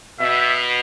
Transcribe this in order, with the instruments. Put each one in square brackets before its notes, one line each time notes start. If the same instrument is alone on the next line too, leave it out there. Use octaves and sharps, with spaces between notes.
[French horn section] B2 [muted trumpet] E5